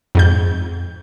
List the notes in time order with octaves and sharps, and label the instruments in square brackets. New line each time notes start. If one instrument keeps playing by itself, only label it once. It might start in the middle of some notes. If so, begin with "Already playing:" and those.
[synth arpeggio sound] F2 G#2 G6